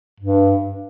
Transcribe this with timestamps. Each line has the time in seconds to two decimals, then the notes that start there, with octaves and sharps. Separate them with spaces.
0.20 G2